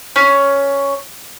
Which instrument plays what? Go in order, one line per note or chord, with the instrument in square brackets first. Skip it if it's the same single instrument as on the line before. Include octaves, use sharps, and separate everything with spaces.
[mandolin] C#4